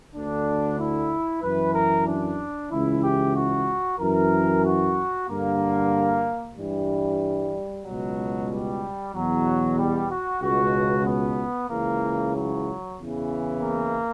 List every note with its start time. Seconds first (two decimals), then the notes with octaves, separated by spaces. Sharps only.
0.14 D2 D3 D4
0.78 E4
1.42 F#2 E3 B4
1.74 A#4
2.07 D4
2.70 C#2 C#3 E3 E4
3.03 G4
3.35 F#4
3.99 F#2 E3 A#4
4.64 F#4
5.28 G2 D3 A#3
6.56 G2 E3 G3
7.85 C#2 B2 F#3
8.49 G3
9.13 E2 B2 F#3
9.77 G3
10.09 F#4
10.41 C#2 B2 F#4
11.06 B3
11.70 C#2 C#3 E3 A#3
12.34 F#3
12.98 E2 C#3 E3
13.63 A#3